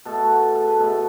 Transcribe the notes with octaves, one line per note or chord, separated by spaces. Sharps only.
B2 A3 A4
F#4
A4
B4
B2 A3 A4